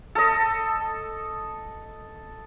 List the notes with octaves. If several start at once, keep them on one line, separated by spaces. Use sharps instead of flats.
A4 D#5